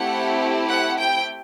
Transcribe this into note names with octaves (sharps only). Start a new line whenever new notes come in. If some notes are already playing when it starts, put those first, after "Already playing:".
Already playing: A3 C4 E4 G4 F#5
F#5
G5